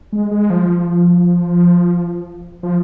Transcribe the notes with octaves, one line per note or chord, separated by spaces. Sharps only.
G#3
G#3
F3
F3